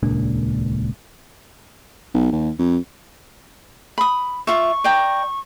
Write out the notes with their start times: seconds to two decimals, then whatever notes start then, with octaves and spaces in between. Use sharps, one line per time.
0.03 D#1 C#2 A#2 D4
2.14 B1
2.32 D#2
2.59 F2
3.98 B5 D#6
4.47 F4 E5 C#6
4.84 D5 G5 A#5